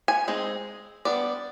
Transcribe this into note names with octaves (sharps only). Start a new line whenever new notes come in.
G#5
G#3 C4 D#4
G3 B3 D4 D5